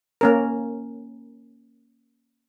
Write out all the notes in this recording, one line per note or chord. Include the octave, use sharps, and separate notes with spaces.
A#3 C#4 A#4